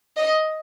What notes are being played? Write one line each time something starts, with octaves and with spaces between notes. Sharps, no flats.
D#5